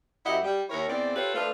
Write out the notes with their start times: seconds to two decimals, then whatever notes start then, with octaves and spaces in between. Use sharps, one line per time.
0.25 F#2 E4 G4 D#5 E5 F#5
0.43 G3
0.69 D#2 E4 A#4 C#5
0.88 E2 C4 D5
1.16 F4 G4 A4 B4 C#5 F5
1.35 F3 A3 D4 F4 A4 B4